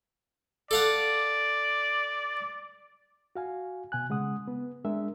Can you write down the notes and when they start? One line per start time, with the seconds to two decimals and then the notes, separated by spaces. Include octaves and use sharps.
0.71 A4 D5 F5 F#5
3.36 F#4 F5 G#5
3.92 B2 G#5 F#6
4.10 C#3 G#3 F#5 D#6
4.48 B3
4.84 G#3 D4 G#4 A#4 E5